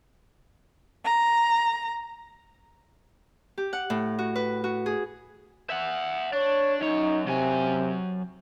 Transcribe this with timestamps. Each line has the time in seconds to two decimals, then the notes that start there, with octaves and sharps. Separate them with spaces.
1.04 A#5
3.58 G4
3.73 F#5
3.90 A2
4.19 F#4
4.35 B4
4.64 F#4
4.86 G#4
5.70 E5 F#5
6.33 D4 C#5
6.81 F#2 D#4 C#5
7.27 C3 F#3 G#5